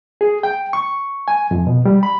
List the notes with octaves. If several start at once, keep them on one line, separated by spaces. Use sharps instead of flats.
G#4
G5
C#6
G#5
F2
B2
G3
B5